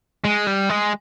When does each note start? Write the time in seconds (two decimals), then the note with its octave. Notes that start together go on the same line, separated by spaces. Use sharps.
0.25 G#3
0.47 G3
0.70 G#3